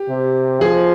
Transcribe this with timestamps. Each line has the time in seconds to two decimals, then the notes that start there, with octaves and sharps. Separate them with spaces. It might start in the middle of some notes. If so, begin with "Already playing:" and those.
Already playing: G4
0.09 C3
0.61 F3 G#4